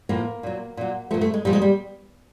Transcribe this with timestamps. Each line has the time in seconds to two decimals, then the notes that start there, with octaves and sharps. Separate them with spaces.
0.09 A2 F3 A#3
0.43 A#2 F#3
0.77 A#2 F#3
1.11 A#2 F3 A3
1.21 A3
1.34 G#3
1.45 A#2 F3 G3
1.53 G#3
1.62 G3